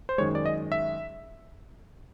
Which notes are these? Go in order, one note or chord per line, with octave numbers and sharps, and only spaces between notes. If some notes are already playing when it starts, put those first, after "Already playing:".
C5
F#2 D#3 G#3 C#5
D5
D#5
E5